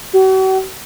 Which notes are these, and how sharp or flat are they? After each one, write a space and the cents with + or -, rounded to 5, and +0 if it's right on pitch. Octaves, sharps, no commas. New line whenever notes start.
F#4 +45